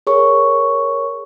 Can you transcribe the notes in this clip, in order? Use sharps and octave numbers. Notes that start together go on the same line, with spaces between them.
G#4 A#4 C#5 C#6